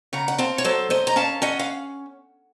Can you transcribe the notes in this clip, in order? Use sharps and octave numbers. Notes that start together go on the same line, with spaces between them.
C#3 F#5 A#5
F#5
C4 F5 A5
C#5
F#3 A4 C5
F#2 C5 D#5
A#5
C#4 F5 A5
C#4 D#5 F#5
F5